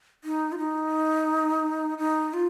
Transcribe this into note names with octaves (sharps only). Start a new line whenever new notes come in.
D#4
F4
D#4
D#4
F4